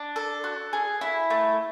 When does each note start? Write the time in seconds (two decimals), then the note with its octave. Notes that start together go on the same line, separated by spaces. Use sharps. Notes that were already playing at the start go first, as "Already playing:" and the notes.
Already playing: D4
0.16 A4
0.44 F#4
0.73 G#4
1.01 E4
1.30 A3